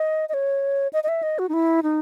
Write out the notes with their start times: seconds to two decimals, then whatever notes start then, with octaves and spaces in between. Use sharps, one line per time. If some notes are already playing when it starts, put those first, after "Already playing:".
Already playing: D#5
0.29 D#5
0.34 C#5
0.93 D#5
1.04 D#5
1.08 E5
1.23 D#5
1.39 F#4
1.49 D#4
1.53 E4
1.83 D#4